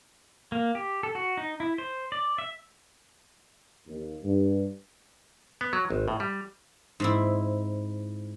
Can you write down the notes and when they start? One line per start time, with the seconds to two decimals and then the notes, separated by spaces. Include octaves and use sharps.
0.52 A#3
0.75 G4
1.03 A4
1.15 F#4
1.37 D#4
1.60 E4
1.78 C5
2.12 D5
2.38 E5
3.87 D#2
4.23 G2
5.61 B3
5.73 F#3
5.90 G#1
6.08 A2
6.20 G3
7.00 G#2 C4 E4